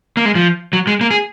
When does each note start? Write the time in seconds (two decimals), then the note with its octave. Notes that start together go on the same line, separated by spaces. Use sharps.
0.17 A#3
0.25 G#3
0.35 F3
0.73 F#3
0.87 G#3
1.01 A#3
1.11 G#4